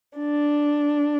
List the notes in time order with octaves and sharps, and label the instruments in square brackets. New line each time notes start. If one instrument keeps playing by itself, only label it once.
[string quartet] D4